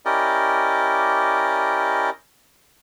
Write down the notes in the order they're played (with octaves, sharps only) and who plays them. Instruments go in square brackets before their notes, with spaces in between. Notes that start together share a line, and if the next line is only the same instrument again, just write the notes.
[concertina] C#4 E4 G4 A#4 D5 D#5